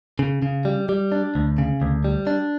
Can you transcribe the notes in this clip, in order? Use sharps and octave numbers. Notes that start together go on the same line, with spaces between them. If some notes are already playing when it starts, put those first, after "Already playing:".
C#3
C#3
G3
G3
D4
D2
C#3
D2
G3
D4